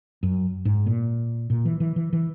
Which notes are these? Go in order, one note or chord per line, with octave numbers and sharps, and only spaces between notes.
F#2
G#2
A#2
A#2
E3
E3
E3
E3